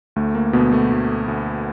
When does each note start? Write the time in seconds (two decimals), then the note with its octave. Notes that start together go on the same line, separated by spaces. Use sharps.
0.16 D2 A3
0.35 A#3
0.53 D2 B2 B3
0.72 A3
0.90 D2
1.28 D2